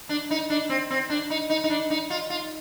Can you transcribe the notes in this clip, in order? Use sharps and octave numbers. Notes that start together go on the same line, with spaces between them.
D4
D#4
D4
C4
C4
D4
D#4
D#4
D#4
D4
D#4
F4
F4